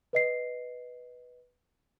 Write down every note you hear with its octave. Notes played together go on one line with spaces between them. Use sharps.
B4 D#5 C7